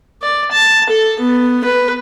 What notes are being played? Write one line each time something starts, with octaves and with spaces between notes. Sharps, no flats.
D5
A5
A4
B3
B4